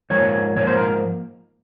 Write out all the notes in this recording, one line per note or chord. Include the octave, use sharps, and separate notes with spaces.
G#2 F3 A#3 C#5
G#2 F3 A#3 C#5
C5
A#4